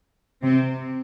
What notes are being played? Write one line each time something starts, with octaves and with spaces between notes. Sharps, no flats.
C3 C4